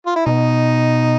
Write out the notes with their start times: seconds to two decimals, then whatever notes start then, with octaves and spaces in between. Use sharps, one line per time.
0.06 F4
0.16 E4
0.26 B2 D#4